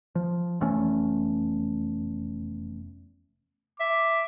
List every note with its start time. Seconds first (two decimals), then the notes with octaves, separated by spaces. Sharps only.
0.15 F3
0.60 F1 E2 A3 C#4
3.80 E5 D6